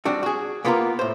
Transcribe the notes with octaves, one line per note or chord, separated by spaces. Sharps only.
G3 C4 D4 F#4
F#4 G#4
A#3 B3 F4 G4 G#4 A#4
A2 C5